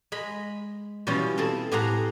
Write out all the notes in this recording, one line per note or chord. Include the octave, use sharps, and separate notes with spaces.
G#3 D#5 B5
B2 E3 G3 C#4 F4
C4 E4 G#4 A4
A2 G4 G#4 C5 F#5 A#5